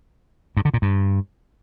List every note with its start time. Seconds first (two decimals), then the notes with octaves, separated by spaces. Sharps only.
0.57 G2
0.65 D3
0.74 A#2
0.82 G2